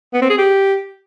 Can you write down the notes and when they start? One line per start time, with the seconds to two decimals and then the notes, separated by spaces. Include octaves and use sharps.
0.14 B3
0.22 C4
0.30 G#4
0.38 G4